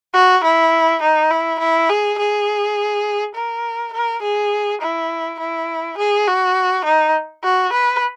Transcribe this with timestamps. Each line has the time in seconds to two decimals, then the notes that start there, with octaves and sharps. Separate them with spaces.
0.14 F#4
0.44 E4
1.02 D#4
1.31 E4
1.60 E4
1.89 G#4
2.18 G#4
3.35 A#4
3.93 A#4
4.22 G#4
4.81 E4
5.40 E4
5.98 G#4
6.27 F#4
6.85 D#4
7.44 F#4
7.73 B4